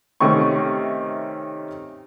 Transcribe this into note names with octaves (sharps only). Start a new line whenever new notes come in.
C3 D#3 A3 C#4 C#6